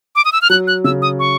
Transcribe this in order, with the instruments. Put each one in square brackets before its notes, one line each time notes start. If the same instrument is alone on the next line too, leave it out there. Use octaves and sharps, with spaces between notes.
[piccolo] D6
D#6
E6
F6
[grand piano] F#3 [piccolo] F#6
[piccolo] F#6
[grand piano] C#3 [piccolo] E6
[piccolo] D#6
C#6